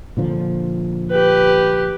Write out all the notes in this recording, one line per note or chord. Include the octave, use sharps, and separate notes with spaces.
A#2 D3 F3
G4 B4